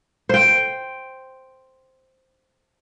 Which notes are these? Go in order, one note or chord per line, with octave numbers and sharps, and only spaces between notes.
C5 G5